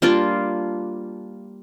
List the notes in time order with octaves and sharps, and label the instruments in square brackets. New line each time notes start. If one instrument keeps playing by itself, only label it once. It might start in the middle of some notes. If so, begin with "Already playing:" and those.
[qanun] G3 A#3 D4 F4